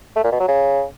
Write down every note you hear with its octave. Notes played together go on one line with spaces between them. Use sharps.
A3
A#2
B2
F#3
C#3